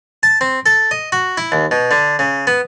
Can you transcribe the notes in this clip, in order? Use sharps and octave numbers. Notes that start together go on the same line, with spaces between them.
A5
C4
A4
D#5
F#4
E4
D#2
B2
D3
C#3
B3